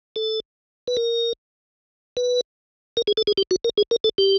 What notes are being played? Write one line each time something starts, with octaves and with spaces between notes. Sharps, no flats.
A4
B4
A#4
B4
A#4
G#4
A4
G#4
G4
F#4
A#4
G#4
A#4
A4
G4